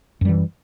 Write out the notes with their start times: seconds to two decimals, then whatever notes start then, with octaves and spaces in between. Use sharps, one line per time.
0.21 F#2
0.25 G3
0.29 E3